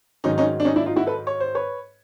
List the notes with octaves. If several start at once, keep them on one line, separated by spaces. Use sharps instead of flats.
G#2 D#3 F#3 C#4 D#4
C#4 D#4
D4
C#4 D#4
D4 E4
D#4 F4
E4 F#4
A4 B4
C#5
C5
B4 C#5